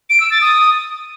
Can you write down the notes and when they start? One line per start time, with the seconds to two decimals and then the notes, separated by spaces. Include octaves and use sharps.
0.10 D7
0.20 E6
0.31 A6
0.41 D#6